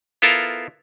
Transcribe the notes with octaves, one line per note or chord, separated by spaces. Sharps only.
B3 E4 F4 A4 A#4 F5